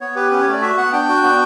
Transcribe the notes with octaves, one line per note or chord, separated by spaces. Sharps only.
B3 C#5
G4 B4
C#4 B4
C#5
A3
D5
F#4 E5
B3 F#5
D4 G5
F#4
B3